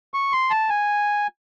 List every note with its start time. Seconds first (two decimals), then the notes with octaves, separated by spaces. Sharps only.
0.14 C#6
0.33 C6
0.50 A5
0.69 G#5